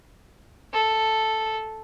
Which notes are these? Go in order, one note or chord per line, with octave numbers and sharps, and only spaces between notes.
A4